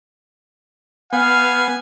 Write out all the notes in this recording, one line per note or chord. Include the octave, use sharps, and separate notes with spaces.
B3 F5 G#5